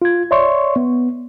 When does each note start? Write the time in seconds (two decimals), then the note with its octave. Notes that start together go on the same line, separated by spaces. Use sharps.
0.02 F4 G#6
0.31 C#5 D5 E5 C6 C#6
0.76 B3